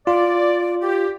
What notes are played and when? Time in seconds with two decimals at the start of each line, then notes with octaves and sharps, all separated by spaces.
0.07 F4 D5
0.82 G4